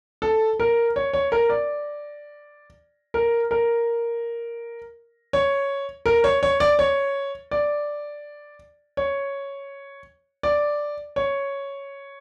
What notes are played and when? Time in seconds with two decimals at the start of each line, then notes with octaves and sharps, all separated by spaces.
0.22 A4
0.60 A#4
0.96 C#5
1.13 C#5
1.32 A#4
1.50 D5
3.14 A#4
3.51 A#4
5.33 C#5
6.06 A#4
6.24 C#5
6.43 C#5
6.60 D5
6.79 C#5
7.51 D5
8.97 C#5
10.43 D5
11.16 C#5